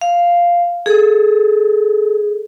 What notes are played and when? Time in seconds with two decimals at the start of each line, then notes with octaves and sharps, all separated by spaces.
0.01 F5
0.86 G#4 A4